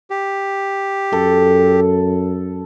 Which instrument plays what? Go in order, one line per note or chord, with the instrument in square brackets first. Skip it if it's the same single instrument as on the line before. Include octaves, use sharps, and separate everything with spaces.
[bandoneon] G4
[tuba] F#2 [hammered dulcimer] A4